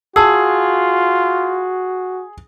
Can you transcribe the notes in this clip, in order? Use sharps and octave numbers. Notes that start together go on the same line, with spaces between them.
F4 F#4 G#4 A5 E6